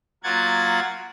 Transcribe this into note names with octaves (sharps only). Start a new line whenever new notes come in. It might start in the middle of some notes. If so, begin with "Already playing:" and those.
F#3 A#3 F4 F#5 G#6 A6